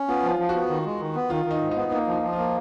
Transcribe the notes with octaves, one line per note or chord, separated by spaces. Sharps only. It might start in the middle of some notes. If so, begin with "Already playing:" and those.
Already playing: C#4
B3 F4
F3
F4
F3
F#4
B3
D#3
G#3
D#3
B3
D#3 F4
D#3
D#4
G#2
B3 D#4
A#3 D#4
F3
D#4
F3
A#3 F4